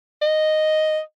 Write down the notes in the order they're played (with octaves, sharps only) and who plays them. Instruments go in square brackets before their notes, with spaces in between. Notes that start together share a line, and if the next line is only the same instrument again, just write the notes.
[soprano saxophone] D#5